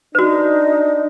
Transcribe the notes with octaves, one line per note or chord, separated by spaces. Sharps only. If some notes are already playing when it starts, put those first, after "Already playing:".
D4 D#4 F#4 B4